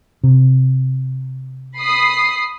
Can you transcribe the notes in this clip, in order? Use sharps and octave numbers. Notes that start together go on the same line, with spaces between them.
C3
B5 D#6 C7